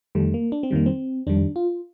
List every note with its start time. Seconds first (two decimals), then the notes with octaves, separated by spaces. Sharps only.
0.15 F2 D#3 G3 A3
0.34 A#3
0.52 D4
0.63 C4
0.71 F2 D#3 G3 A#3
0.86 C4
1.27 F2 D#3 G3 D4
1.56 F4